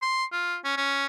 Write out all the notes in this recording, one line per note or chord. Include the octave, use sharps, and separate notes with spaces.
C6
F4
C#4
C#4